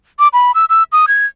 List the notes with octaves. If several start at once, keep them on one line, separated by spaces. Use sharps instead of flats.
D6
B5
E6
E6
D#6
G#6